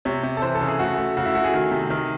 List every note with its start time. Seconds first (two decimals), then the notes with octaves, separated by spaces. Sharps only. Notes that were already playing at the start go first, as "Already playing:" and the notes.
0.05 C3 C#5
0.23 C3
0.37 A4
0.42 E3 C5
0.55 A4
0.61 C#3
0.67 G#4
0.79 A3 F#4
0.97 A3
1.17 C#3 F#4
1.25 E4
1.34 A3 F#4
1.44 G#4
1.54 D#3
1.71 C3
1.90 D#3